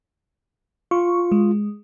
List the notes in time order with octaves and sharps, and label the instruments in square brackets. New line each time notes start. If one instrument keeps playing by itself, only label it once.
[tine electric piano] F4 [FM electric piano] C#6
[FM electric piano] G#3